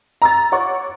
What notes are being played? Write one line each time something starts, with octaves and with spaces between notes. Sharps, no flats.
A#5 E6 A6
C#5 F#5 C#6 D6